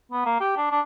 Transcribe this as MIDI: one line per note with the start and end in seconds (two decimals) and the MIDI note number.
0.12 0.25 59
0.26 0.37 58
0.40 0.56 67
0.57 0.68 62
0.71 0.80 62